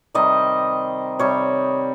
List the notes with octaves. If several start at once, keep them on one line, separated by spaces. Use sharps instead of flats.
C3 D#3 G3 D#5
C3 G3 C#5